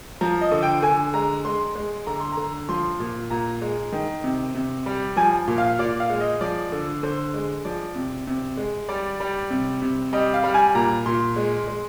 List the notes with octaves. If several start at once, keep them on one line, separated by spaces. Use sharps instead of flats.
F3 A#5
D#5
D3
G5
D3 G#5
G#3 A#5
G#3 C6
G#3
D3 A#5
C6
D3 A#5
F3 C6
A#2
A#2 A#5
G#3
D#3
C3
C3
G3
F3 G#5
A#2
F5
A#2 D5
F5
G#3
D#5
F3 D5
D3
D3 C5
G#3
F3 D5
C3
C3
G#3
G3 D5
G3
C3
C3
G3 D#5
F5
G3
G#5
A#2 A#5
A#2 C6
G#3
G#3